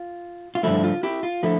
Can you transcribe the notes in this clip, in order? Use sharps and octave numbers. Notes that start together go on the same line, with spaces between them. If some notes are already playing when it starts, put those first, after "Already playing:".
Already playing: F4
F4
G2 D3 F3 A3 E4
F4
E4 G4
F4
D3 F3 A3 E4